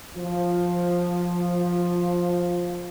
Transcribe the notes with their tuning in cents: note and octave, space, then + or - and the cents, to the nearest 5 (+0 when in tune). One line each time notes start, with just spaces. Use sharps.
F3 +10